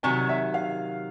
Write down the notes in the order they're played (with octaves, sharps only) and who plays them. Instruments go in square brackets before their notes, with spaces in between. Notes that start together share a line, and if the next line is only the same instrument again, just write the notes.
[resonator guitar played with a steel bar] C3 D#3 F#3 [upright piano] G#5
[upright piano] E5
F5